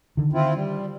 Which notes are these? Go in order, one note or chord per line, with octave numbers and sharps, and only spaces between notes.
D3 D#3
C4 E4 F4
G3